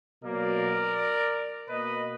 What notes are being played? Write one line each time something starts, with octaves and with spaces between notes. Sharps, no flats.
B2 F#3 A#3 A#4 D5
B2 A#3 B4 D#5